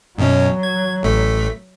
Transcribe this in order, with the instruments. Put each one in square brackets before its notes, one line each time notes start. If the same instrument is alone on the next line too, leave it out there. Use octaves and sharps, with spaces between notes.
[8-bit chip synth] F#2 B2 C#4 [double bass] F#3
[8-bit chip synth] G#6
A1 A3 B6